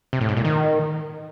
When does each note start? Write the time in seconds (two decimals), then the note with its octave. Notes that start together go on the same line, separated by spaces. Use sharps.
0.13 C3
0.21 A2
0.29 G#2
0.37 A#2
0.45 D#3